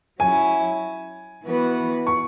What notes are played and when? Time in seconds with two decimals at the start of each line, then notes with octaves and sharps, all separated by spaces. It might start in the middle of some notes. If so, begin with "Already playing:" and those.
0.20 F#3 C#4 E4 G#5
1.44 E3 B3 F#4 B4
2.07 C#6